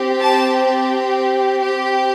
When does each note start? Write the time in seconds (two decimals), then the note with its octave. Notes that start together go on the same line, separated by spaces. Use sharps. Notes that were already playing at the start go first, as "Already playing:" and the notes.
Already playing: C4 G4
0.21 A5
1.63 C4 G4